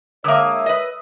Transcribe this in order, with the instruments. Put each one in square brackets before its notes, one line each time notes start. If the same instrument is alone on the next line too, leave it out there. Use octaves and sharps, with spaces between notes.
[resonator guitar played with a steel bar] D3 A#3 [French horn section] G#3 A#4 C#5 [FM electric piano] E5 D#6 E6
[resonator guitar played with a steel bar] B4 D#5